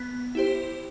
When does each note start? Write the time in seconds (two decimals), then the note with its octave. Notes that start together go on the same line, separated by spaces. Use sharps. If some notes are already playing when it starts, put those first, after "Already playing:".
Already playing: B3
0.35 E4 G4 C5